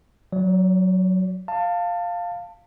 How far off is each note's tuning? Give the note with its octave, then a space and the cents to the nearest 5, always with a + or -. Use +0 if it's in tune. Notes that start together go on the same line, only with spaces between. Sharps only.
F#3 +0 D5 -45
F5 +0 A5 +25